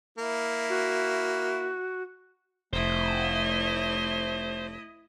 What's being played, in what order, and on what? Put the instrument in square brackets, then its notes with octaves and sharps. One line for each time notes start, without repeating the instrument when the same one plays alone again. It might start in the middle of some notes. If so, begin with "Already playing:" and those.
[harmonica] A#3 E4
[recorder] F#4
[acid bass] F1 [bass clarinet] A3 [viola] E4 D#5 [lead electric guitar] C5